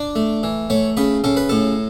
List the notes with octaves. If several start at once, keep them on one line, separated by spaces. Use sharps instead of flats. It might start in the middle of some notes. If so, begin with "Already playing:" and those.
Already playing: D4 D5
A3
E3
A3 C#5
C#3 B4
C#3 A4
B4
A2 A4